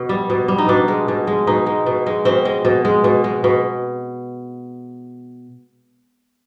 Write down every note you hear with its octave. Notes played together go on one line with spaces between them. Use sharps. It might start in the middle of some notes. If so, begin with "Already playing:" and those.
Already playing: B2
G3
B2
G3
D#4
B2 D4
G#3
B2
G#3
B2 D#4
G#3
B2
G#3
B2 C4
G#3
B2
G#3
B2
G#3
B2